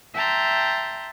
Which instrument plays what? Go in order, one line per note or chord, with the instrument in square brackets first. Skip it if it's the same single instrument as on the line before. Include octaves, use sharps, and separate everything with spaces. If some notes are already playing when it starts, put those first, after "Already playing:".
[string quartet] E5 G5 A5 A#5 C6